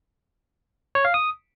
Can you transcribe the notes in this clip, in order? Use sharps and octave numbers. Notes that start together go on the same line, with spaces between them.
C#5
F5
D#6